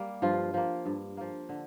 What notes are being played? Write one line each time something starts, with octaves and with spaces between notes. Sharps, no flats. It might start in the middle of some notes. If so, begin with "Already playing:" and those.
Already playing: G3 A#3
G2 F3 F4
F3 A#3
G2
F3 A#3
D3